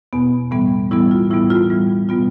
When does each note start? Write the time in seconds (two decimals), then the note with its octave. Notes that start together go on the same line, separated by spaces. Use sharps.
0.13 E2 B2 B3
0.51 A2 E3 G3 B3
0.91 A2 E3 G3 B3 E4
1.11 F4
1.30 A2 E3 G3 B3 E4
1.50 F4
1.70 A2 E3 G3 B3
2.09 B2 G3 B3 F4